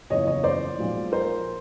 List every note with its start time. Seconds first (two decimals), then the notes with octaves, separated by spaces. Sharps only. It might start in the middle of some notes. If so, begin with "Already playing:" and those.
0.10 F#1 E2 C#3 F3 C#5 D#5
0.27 C#5 D#5
0.44 C5 D5
0.79 B1 A#2 F3 G#3
1.12 A#4 C5